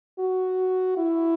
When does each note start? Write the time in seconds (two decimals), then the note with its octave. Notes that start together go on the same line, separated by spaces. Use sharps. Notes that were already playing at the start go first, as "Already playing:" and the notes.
0.19 F#4
0.97 E4